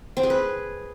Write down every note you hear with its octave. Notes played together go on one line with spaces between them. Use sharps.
C4
G#4
B4